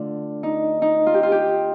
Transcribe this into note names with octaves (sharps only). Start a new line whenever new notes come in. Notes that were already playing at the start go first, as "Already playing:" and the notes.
Already playing: D3 A3 D4 F4
D#4
D#4
F4
G4
F4
G4